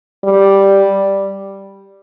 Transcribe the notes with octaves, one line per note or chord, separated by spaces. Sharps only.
G3